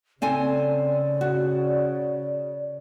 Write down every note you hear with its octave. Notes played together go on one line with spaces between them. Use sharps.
C#3 C4 A4 D5 G#5
F#4